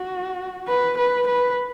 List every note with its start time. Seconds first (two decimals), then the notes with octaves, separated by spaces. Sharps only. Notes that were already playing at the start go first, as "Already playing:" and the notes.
Already playing: F#4
0.68 B4
0.98 B4
1.27 B4